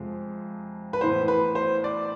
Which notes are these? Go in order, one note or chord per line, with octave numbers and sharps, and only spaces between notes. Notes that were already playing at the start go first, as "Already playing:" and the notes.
Already playing: F2 C3 F3 G#3
B4
A2 E3 B3 C5
B4
C5
D5